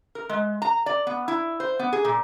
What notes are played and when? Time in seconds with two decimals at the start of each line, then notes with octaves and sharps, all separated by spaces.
0.15 A#4
0.29 G#3
0.62 A#5
0.86 D5
1.07 B3
1.28 E4
1.60 C5
1.79 B3
1.93 G#4
2.05 A#2